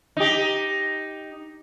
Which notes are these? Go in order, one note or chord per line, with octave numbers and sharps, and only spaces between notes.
D#4 G4